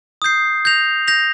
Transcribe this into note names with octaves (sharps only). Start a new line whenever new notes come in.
D#6 G6 C7
G6 A#6 F7
G6 A#6 F7